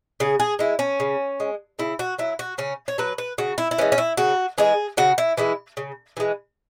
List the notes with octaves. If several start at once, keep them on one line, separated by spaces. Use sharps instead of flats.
C#3 G#4
G#4
G#3 E4
C#4
C#3
G#3
C#3 E4
F#4
F#3 E4
F#4
C#3 C#4
C#5
F#3 B4
B4
C#3 F#4
E4
E4
E3 G#3 C#4
C#4
E4
C#3 F#4
E3 G#3 G#4
C#3 F#4
E4
E3 G#3 E4
C#3
E3 G#3